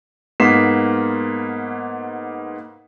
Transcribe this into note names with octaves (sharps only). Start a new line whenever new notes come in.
G#2 A#3 B3 B6 C7 E7